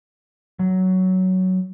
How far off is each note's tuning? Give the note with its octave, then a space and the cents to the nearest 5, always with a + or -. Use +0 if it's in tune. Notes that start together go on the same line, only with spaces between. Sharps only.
F#3 +10